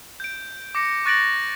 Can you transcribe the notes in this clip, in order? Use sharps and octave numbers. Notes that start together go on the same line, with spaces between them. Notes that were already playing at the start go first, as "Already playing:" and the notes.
G6 D7
D6 A#6 C#7
C#6 F#6 A6 A#6 D7 F#7